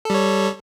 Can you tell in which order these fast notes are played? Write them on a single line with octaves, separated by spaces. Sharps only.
A4 G3 C#5